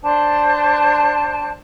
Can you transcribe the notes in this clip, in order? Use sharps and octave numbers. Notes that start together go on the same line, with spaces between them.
D4 C5 G5 A5